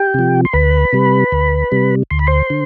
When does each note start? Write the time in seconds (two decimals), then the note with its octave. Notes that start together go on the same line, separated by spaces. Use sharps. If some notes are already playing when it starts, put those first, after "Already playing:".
Already playing: G4 G5
0.14 C3 F3
0.45 C6
0.53 D2 B4 B5
0.93 C3 G3
1.32 D2
1.72 C3 G3
2.11 D2 C6
2.19 B5
2.27 C5 C6
2.50 D3